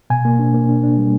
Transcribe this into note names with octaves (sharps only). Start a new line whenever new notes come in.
B2 G#5
A#3
D4
A#3
D4
D4
G3